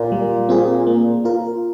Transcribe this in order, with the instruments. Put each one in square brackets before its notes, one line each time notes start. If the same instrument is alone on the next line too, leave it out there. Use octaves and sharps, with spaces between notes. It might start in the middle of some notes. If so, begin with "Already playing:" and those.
Already playing: [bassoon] A#2
[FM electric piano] G3
C4 F4 G#4
A#3
F4 A#4